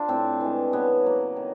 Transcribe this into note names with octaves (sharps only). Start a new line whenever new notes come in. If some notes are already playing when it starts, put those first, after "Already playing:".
Already playing: D4 F4 C5
A2 C4
E3 G#3
C#3 B3
F#3 A#3
D#3